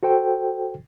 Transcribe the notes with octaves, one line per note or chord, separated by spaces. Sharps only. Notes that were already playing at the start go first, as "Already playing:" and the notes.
F#4 A4 C5 G5